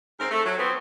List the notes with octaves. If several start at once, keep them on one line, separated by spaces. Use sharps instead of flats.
G#2 C4 A#4
A3
F#3
F3 B3 C4